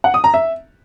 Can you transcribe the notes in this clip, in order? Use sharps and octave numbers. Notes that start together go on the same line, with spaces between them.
F#5
D#6
A#5
E5